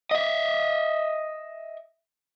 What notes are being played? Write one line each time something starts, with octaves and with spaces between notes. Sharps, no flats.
D#5 E5